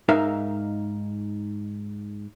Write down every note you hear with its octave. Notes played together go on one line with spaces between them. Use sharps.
G#2 D#4 A#4 E5 F5